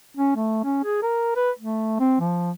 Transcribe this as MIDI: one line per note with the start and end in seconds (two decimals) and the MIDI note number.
0.17 0.33 61
0.36 0.63 57
0.64 0.80 61
0.84 1.01 68
1.02 1.33 70
1.36 1.51 71
1.59 1.96 57
2.00 2.17 60
2.20 2.51 53